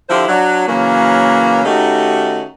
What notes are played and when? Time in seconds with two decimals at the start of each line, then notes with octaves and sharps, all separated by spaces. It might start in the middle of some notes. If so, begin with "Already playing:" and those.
0.09 D3 F3 E4 F4 G4 C5
0.28 F#3 D4
0.67 C#3 E3 F#3 A#3
1.65 D#3 A3 C#4 D#4 F#4 G4